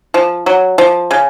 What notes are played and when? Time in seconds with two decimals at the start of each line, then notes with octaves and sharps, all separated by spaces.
0.14 F3
0.46 F#3
0.78 F3
1.11 C#3